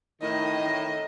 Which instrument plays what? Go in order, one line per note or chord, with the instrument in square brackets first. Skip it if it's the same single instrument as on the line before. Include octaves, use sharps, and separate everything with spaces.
[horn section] A2 D#3 [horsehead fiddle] D#5